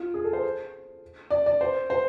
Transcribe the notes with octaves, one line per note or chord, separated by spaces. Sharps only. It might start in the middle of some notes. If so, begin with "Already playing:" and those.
Already playing: F4
G#4
A4
C5
D5
D5
C5
C5